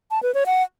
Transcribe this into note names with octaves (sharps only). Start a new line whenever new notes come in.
A5
B4
C#5
F#5